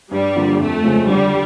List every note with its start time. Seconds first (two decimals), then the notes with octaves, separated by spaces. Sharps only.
0.11 G2 G3
0.35 D3 F3 A#3 D4
0.60 F2 A3
0.83 C#3 F3 G#3 C4
1.08 D3 G3